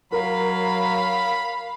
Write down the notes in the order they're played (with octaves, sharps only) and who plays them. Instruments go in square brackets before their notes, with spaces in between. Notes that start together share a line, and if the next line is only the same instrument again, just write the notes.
[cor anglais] F#3 [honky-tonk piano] A#4 [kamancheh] F5 [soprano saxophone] B5